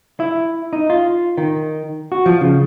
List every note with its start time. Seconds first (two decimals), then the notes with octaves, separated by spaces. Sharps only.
0.20 E4
0.73 D#4
0.90 F4
1.38 D#3
2.12 F#4
2.26 F3
2.41 C#3